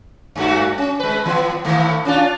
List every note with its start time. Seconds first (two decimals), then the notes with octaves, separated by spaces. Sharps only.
0.36 G2 A3 F#4
0.78 C#4
1.00 G#3 B4
1.26 E3 B3
1.65 A2 D#3 A3
2.05 C#4 D4 F4